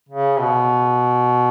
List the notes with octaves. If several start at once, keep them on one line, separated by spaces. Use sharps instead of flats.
C#3
B2